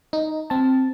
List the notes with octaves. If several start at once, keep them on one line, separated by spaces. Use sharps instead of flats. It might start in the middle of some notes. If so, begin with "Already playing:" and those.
D#4
C4 A5